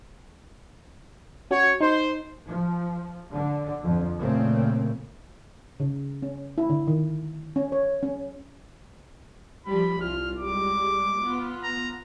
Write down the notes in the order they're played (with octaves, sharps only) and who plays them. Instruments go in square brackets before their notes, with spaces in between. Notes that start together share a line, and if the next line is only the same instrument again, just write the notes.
[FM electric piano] C#4 F#4 [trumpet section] C#5
[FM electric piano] D#4 [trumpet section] C5
[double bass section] F3
D3
F2
A#2 C#3 A3 A#3 C4
[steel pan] C#3
C#4
E4
D3
D#3
C#4
C#5
C#4
[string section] F3 G3 [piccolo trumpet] B5
[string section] C2 F4 [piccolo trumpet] F6
[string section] G3 G#3 [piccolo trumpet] D6
[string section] B3 F4
[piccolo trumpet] A#5